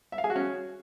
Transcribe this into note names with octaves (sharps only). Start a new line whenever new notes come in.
E5
F5
G#4
F#4
C#4